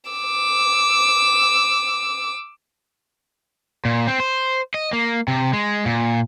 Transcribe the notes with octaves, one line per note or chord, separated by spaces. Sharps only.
D6 E6
A#2
C4
C5
D#5
A#3
C3
G#3
A#2